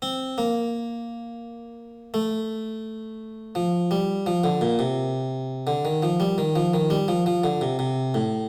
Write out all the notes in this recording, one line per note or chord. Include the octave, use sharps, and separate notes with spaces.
C4
A#3
A3
F3
G3
F3
D3
A#2
C3
D3
D#3
F3
G3
D#3
F3
D#3
G3
F3
F3
D3
C3
C3
A2